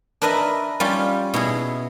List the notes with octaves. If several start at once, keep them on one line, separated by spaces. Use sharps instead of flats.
D4 A#4 B4 D#5 E5
G3 C#4 F4 G4
B2 E4 G#4